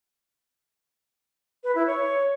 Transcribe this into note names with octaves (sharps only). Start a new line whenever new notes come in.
B4
E4
C#5